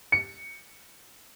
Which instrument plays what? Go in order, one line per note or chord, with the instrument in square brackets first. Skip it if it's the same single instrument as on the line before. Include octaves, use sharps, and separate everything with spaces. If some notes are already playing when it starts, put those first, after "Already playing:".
[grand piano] C#7